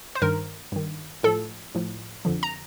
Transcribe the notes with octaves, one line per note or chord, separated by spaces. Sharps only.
C5
G2 D#3 A#4
G2 D#3
A2 F3 A4
A2 F3
F2 D3 F3
A#5